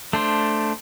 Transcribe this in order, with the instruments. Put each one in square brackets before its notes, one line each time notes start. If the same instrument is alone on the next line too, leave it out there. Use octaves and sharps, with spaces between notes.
[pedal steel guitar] A3 D4 C5